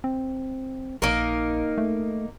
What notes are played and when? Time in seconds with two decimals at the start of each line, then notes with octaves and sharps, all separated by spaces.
0.04 C4
1.02 A#1 A#3 D#4 A#4
1.78 A3